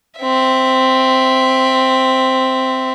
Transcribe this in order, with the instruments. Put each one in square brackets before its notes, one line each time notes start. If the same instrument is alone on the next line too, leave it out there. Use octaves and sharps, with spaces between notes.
[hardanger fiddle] C4 E5